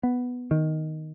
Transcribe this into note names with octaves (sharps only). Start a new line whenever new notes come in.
B3
D#3